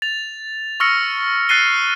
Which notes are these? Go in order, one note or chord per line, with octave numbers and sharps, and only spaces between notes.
A6 F7
C#6 E6 F6 A#6 C#7
F6 F#6 A6 C7 D#7 G7